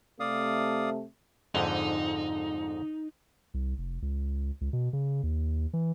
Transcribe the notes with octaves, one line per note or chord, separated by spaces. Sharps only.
C3 A3 D5 F5 D#6
F2 G#2 D3 D#4
C2
F1
C#2
C#2
B2
C#3
D#2
E3